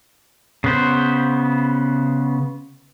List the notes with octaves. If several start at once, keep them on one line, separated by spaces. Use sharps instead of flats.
C#3 B3 C5